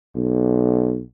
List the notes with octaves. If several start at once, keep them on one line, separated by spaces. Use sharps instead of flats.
B1